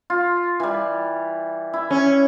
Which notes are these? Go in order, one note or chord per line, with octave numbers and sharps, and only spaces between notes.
F4
E3 G3
E4
C#4